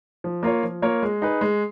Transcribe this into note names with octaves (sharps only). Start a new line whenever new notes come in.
F3
A#3 F4 A#4 C#5
F3
A#3 F4 A#4 C#5
G#3
D#4 G#4 B4
G#3